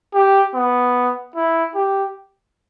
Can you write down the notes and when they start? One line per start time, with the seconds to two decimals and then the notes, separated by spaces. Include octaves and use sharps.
0.14 G4
0.55 B3
1.36 E4
1.75 G4